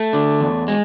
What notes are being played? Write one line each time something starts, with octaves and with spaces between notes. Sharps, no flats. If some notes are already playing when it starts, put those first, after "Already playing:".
Already playing: A3
D3
E2
G#3